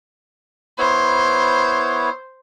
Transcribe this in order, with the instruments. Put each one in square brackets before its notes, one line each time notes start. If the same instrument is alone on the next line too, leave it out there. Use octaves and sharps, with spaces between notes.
[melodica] B3 E4 C#5 [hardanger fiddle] C5